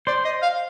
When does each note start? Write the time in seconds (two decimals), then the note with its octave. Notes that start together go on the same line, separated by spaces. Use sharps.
0.07 C5 D5
0.25 D#5
0.42 F5